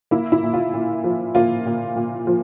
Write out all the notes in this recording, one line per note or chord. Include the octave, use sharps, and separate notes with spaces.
A#3 E4
E4
A#2
F4
A#2
F3
A#3 F4
A#2
A#2
F3